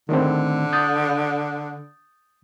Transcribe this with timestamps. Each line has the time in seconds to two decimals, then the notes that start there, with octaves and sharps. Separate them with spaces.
0.09 D3 D#3 A3 C4
0.73 D#6 G6 A6